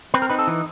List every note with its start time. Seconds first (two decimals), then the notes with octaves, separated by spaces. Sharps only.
0.14 C4 B4
0.22 A#4
0.30 D#4 B4
0.39 A4
0.47 E3